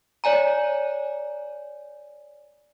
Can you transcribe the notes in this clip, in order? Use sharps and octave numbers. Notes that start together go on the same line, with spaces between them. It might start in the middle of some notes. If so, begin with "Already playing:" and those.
C#5 D5 G#5 A#5